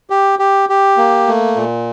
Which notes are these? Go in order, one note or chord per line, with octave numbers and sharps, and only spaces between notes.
G4
G4
G4
A#3
A3
A#2